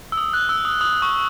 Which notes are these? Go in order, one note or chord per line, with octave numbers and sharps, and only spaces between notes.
E6
D#6
F#6
E6
D#6
D#6
C#6